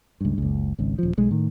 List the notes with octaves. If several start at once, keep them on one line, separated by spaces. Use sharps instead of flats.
C#2 G2
F#1 C#2
G#1 C#2
D#1 F3
B1 G#3
A2 D#3